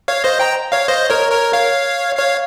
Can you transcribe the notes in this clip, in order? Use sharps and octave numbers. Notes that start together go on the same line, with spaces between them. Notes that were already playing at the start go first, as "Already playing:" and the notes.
C#5 F5
C5 D#5
G5 A#5
C#5 F5
C5 D#5
A#4 C#5
A#4 C#5
C#5 F5
C#5 F5